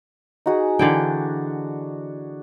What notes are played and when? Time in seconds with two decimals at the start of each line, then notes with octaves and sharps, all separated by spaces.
0.46 D#4 F#4 G#4
0.79 D3 E3 D4 G5